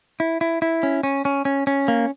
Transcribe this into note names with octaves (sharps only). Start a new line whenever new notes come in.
E4
E4
E4
C#4
C#4
C#4
C#4
C#4
A#3